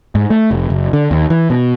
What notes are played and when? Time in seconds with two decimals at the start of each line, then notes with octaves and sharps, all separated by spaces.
0.15 G#2
0.30 A3
0.51 F1
0.70 F#1
0.93 D3
1.11 D#2
1.30 E3
1.50 B2